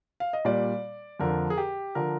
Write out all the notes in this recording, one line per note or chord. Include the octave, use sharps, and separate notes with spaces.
F5
D#5
A#2 G3 D5
F2 D3 F3 A#4
G#4
G4
D3 F3 A#4